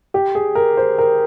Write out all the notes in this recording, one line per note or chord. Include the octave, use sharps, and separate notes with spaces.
G4
G#4
A#4
C5
A#4